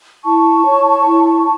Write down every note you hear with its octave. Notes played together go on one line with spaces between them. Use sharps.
E4 A5 C#6
C#5
E4